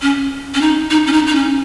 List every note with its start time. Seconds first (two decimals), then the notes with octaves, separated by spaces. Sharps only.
0.02 C#4
0.54 C#4
0.61 D#4
0.91 D#4
1.07 C#4
1.13 D#4
1.27 D#4
1.35 C#4